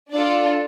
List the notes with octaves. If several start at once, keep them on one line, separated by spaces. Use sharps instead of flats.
D4 F4 A4 D5